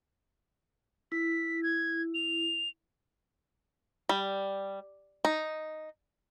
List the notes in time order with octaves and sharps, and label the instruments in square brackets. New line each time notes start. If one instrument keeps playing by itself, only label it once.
[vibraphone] E4 [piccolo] B6
[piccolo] G#6
F7
[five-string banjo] G3
D#4